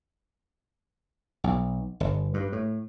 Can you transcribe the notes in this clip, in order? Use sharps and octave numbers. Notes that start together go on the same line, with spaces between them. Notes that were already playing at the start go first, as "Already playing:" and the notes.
B1
G1
G2
A2